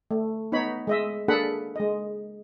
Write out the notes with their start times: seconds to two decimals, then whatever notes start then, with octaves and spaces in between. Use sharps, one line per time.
0.11 A3
0.52 B3 D#4 C#5 B5
0.87 G#3 D#5 E5
1.28 A#3 D4 G#4 A4 F#5 B5
1.76 G#3 D#5